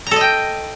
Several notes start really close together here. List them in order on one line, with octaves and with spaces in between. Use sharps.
A#5 A4 D#5 G5